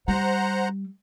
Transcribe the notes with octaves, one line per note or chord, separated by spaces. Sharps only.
G3 C5 F#5 A#5